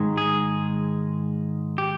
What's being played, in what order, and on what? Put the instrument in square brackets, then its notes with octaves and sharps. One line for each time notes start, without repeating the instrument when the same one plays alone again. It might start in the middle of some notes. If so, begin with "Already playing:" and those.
Already playing: [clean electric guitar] G#2 D#3 G#3
G#4
G4